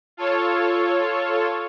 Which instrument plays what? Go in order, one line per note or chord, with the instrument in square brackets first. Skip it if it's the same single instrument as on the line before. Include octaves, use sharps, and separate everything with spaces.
[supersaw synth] F4 A4 C#5